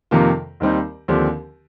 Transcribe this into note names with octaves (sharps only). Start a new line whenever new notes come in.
F2 C3 D#3 A#3 F4
D#2 D#3 G3 C4 D#4
D#2 D3 F3 C4 G4